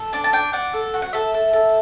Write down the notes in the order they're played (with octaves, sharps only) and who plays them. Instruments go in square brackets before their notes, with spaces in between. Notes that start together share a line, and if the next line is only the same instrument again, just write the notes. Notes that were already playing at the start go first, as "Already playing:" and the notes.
Already playing: [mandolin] A4
D4 A5
A5
D4 G5
D4 F#5
A4
F#4
F#5
A4 E5
A4
A4